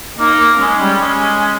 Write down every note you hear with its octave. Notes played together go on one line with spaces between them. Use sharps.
A#3 D#4
A#3
G#3 C#4
G3
G#3